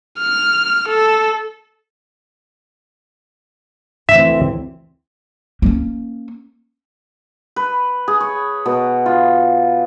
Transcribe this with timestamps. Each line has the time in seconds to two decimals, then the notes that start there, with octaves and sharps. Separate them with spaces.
0.19 F6
0.88 A4
4.09 D2 E3 C4 E5
5.62 A#3 C#4
7.56 B4
8.08 G#4
8.20 C#5
8.66 B2
9.06 F4